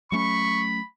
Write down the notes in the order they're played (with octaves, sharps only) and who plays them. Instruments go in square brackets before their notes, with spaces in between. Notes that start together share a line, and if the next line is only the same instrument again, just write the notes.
[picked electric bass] F#3 A3 C#4 [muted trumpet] B5 [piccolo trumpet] C#6